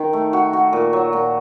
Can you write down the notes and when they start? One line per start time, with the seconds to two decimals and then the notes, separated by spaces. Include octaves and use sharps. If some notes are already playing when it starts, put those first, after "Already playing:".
Already playing: D#3
0.13 A3
0.33 F#4
0.53 F#4
0.73 A#2
0.93 F#3
1.13 A#2